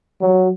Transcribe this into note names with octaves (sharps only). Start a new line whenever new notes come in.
F#3